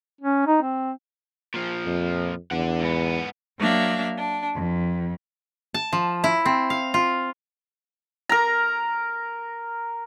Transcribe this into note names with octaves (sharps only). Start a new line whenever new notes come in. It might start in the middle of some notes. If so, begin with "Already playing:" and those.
C#4
D#4
C4
A#2 F3
F2
E2 D4 F#5
G#2 B3
F#3 A#3 D4 E5 F5
D4
F2
A5
F3
E4
C4
F5
F4
A#4 A#5